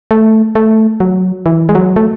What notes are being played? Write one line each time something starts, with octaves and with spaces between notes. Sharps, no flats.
A3
A3
F#3
E3
G#3
F#3
A3